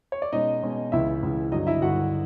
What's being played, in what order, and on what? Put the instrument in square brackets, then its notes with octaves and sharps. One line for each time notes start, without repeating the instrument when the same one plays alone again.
[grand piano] C#5
D5
B2 G#3 C#4 D#4 D#5
B2 G#3 C#4
C#2 C#3 E3 E4 E5
C#2 C#3 E3
G2 D3 F#3 D#4 D#5
E4 E5
G2 D3 F#3 F#4 F#5